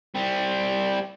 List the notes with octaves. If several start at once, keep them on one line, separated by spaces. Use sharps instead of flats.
G3 C4